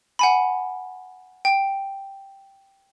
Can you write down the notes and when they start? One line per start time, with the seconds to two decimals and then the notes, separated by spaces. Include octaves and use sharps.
0.19 F#5 G#5 B5
1.45 G5